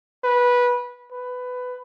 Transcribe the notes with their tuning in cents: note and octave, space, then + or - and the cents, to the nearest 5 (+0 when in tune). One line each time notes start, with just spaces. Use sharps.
B4 -15
B4 +15